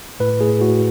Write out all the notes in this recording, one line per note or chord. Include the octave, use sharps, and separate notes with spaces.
A2 B4
A2 G#4
A2 F#4